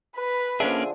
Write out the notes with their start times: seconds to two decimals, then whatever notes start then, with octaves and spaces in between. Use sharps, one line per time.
0.17 B4
0.60 D3 F3 A#3 C#4 D4 G#4 E5